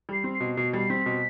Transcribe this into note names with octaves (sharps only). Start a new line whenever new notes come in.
G3 C7
C4
C7
B2
B2 C7
G3
C7
C4 B6
B2